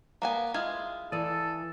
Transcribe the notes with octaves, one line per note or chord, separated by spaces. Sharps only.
A#3 B3 F5 G#5 A#5
G#3 E4 F4 D#6 F6 G#6
E3 A4 D5 D#6 A6 D#7